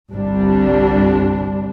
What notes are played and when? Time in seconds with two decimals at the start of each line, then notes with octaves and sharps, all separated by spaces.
0.11 G1 C2 G3 D4